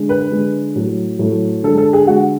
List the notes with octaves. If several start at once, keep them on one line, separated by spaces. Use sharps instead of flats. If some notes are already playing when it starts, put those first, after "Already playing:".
Already playing: D3 G#3
B4
D3 G#3
A2 F#3 A3
A2 F#3 A3
D3 G#3 A4
A4
G#4
D3 G#3 F#4